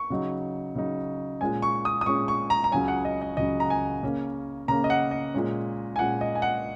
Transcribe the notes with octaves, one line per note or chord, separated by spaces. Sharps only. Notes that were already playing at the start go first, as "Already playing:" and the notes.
Already playing: C#6
C#3 F#3 D#4
C#3 F#3 D#4
A#2 G#3 C#4 G#5
C#6
D#6
D#6
A#2 G#3 C#4 C#6
C#6
A#5
A#5
C#2 C#3 F#3 C#4 G#5
F#5
D#5
D#5
C#2 C#3 F#3 C#4 D#5
A#5
G#5
C#3 A#3 C#4
C#3 A#3 C#4 A#5
D#5
F#5
D#5
A#2 G#3 C#4
G#5
A#2 G#3 C#4 F#5
D#5
G#5
F#5